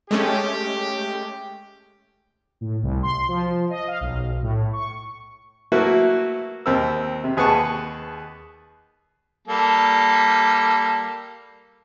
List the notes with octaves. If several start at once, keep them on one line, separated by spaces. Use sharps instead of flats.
G#3 A3 C#4 G4
A2
C2
C6
F3
D#5
F5
B1
A2
C#6
F#3 A3 A#3 E4 F#4 B4
D#2 C4 A#4 E6
C3
D#2 G#4 B4 F#5 A5 C#6
G3 A#3 A4